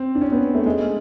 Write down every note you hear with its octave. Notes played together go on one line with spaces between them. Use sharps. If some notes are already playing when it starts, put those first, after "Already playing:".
Already playing: C4
D4
C#4
B3
A3
G#3